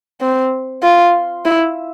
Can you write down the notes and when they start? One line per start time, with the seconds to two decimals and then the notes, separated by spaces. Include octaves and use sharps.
0.21 C4
0.83 F4
1.45 E4